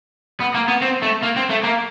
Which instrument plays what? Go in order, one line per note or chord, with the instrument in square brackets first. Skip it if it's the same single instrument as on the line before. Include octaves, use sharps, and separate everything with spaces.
[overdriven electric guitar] B3
A#3
B3
C4
A3
A#3
C4
A3
A#3